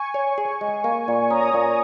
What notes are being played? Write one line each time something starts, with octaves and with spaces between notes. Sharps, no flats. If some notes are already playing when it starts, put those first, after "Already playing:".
Already playing: G#5 C#6
C#5
G#4
G#3
A#3
A#2
C#4 A#5 D#6
A#2